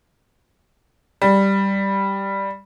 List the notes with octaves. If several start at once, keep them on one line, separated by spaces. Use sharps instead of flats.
G3